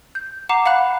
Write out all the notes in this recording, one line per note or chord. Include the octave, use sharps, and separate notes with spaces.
G6
F#5 A#5 D6 C7 E7
F5 F#5 B5 F#6